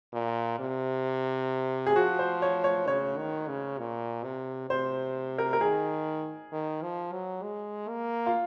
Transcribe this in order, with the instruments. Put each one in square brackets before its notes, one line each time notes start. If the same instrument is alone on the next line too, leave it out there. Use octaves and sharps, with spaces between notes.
[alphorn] A#2
C3
[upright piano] G#4
[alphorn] F3 [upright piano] F#4
[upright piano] C5
C#5
C#5
[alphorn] C#3 [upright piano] C#5
[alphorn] D#3
C#3
A#2
C3
[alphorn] C3 [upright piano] C5
[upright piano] A#4
A#4
[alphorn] D#3 [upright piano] G#4
[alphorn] D#3
F3
F#3
G#3
A#3
[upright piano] F4